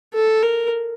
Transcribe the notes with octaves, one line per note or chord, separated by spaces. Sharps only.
A4
A#4